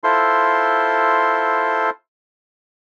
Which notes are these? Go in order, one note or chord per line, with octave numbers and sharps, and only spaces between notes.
E4 F4 A4 C5 C6